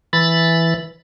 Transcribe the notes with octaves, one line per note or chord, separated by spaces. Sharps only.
E3 B5 A6